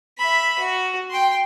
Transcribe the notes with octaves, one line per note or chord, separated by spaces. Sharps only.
E5 B5
F#4
G5 C6